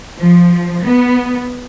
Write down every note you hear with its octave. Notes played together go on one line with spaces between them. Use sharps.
F3
B3